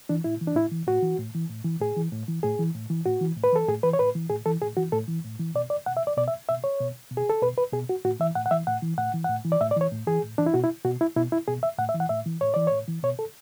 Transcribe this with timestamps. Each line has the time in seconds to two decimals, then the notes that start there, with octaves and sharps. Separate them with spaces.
0.09 E3 D4
0.24 A2 E4
0.41 E3
0.47 D4
0.56 A2 E4
0.72 E3
0.87 A2 F#4
1.03 E3
1.18 A2
1.35 E3
1.50 A2
1.65 E3
1.80 A2 G#4
1.97 E3
2.12 A2
2.28 E3
2.43 A2 G#4
2.59 E3
2.75 A2
2.90 E3
3.05 A2 F#4
3.21 E3
3.37 A2
3.44 B4
3.52 E3 A4
3.68 A2 G#4
3.83 E3 B4
3.93 C#5
3.99 A2 B4
4.15 E3
4.30 A2 G#4
4.46 E3 A4
4.62 A2 G#4
4.77 E3 F#4
4.92 A2 A4
5.08 E3
5.24 A2
5.40 E3
5.55 B2 D5
5.70 D5
5.86 B2 F#5
5.97 E5
6.07 D5
6.17 B2 D5
6.28 E5
6.48 B2 E5
6.64 C#5
6.80 B2
7.11 B2
7.17 G#4
7.30 A4
7.42 B2 B4
7.58 B4
7.73 B2 G#4
7.89 F#4
8.05 A2 F#4
8.20 E3 E5
8.35 A2 F#5
8.46 F#5
8.51 E3 E5
8.67 A2 F#5
8.82 E3
8.98 A2 F#5
9.14 E3
9.24 A2 F#5
9.45 E3
9.52 D5
9.60 A2 E5
9.71 D5
9.76 E3 C#5
9.92 A2
10.07 E3 G#4
10.23 A2
10.38 E3 D4
10.46 E4
10.54 B2 F#4
10.64 E4
10.85 B2 F#4
11.01 E4
11.16 B2 E4
11.32 E4
11.48 B2 G#4
11.63 E5
11.79 A2 F#5
11.89 E5
11.94 E3
12.00 F#5
12.09 A2 E5
12.26 E3
12.41 A2 C#5
12.54 E3 D5
12.67 A2 C#5
12.88 E3
13.03 B2 C#5
13.19 A4